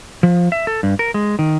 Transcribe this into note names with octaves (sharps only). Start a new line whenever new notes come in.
F3
E5
A4
G2
A#4
G#3
D#3